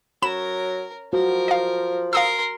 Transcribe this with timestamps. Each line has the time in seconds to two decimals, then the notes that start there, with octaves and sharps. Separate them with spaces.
0.22 F#3 A#4 C#5 B5 E7
1.13 F3 F#4 A#4
1.48 D#5 F5
2.13 A#4 F5 C6 D#6 E6